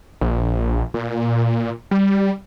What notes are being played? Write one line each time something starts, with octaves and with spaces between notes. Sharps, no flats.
A#1
A#2
G3